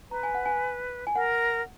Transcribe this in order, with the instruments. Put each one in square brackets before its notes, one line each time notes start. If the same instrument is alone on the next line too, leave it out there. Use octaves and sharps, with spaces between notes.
[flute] B4 [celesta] A#5
[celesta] G#5
F#5
G#5
G#5
[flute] A#4 [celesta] F#5